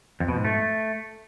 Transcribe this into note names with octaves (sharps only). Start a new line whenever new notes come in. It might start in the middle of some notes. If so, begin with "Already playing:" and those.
F2
B2
G#2
A3